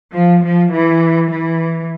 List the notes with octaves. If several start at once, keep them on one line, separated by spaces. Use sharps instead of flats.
F3
F3
E3
E3